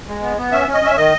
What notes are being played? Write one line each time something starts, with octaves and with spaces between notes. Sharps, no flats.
G#3
B3
B3
C#4 E5
C#4
D#5
C#4 E5
D#3 D#5